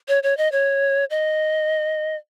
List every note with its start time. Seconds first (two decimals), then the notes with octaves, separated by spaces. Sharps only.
0.08 C#5
0.23 C#5
0.37 D#5
0.52 C#5
1.10 D#5